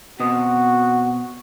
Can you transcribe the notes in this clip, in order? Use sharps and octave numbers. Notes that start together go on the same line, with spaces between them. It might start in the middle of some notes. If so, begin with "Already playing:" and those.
B2 C4 F#4 D#5